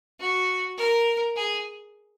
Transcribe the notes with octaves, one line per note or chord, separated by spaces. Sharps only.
F#4
A#4
G#4